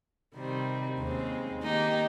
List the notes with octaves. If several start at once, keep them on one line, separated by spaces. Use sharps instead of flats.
C3 D#3 G3 C4
D#2 C#3 G#3 C4
D#3 A#3 D#4 G4